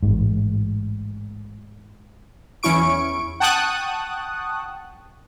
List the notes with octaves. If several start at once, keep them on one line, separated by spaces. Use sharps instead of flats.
A1 G#2
E2 C#4 E4 C#6 D7
F#5 G5 A5 C#6 D#6 F#6